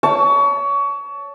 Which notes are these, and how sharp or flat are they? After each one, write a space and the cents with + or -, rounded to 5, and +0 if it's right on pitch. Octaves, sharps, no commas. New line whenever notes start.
C#5 +25 A5 +0